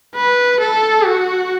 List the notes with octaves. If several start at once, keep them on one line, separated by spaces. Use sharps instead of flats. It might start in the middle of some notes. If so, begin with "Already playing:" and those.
B4
A4
F#4